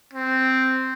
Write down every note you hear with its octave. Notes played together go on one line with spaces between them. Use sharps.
C4